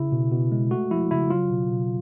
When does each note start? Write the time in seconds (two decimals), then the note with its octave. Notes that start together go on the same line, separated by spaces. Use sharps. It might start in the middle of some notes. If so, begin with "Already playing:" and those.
Already playing: C#3 E4
0.12 B2
0.32 B2
0.52 G#3
0.71 A3 F#4
0.91 F3 E4
1.11 C#3 E4
1.30 F#3 F4
1.50 B2
1.71 B2